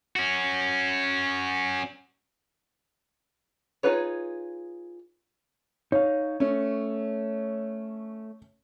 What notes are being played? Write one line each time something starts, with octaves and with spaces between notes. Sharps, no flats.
C#4 F#4
D#4 F4 G#4 B4 C#5
D#4 C#5 F5
A3 C#4